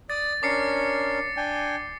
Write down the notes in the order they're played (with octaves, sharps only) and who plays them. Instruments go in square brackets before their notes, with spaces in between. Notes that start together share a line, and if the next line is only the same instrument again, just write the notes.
[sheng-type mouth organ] D5 D#6 [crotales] A6
[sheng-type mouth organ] C#4 D4 A#4 [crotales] D6 C7 C#7
[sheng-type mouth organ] D4 G5 G#5